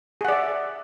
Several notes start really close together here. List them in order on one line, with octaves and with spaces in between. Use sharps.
G#4 F#5 D5 E5